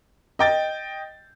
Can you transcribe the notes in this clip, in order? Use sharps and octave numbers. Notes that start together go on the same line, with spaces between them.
D#5 G5 A6